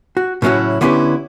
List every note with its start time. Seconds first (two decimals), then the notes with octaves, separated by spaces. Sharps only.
0.17 F#4
0.42 A2 C#3 F#3 C#4 E4 F#4
0.81 D3 B3 C#4 E4 G4 B4